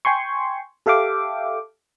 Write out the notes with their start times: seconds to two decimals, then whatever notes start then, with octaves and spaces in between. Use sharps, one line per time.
0.05 G5 G#5 C6 C#6
0.86 G4 A4 E5 F5 G5 D6